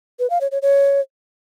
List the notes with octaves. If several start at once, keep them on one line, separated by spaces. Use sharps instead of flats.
B4
F5
C#5
C#5
C#5